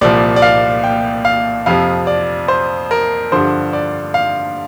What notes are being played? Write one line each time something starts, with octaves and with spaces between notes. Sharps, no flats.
C2 A#2 F3 D5
D5
F5
G5
F5
F2 C3 F3 F5
D5
C5
A#4
G2 D3 F3 C5
D5
F5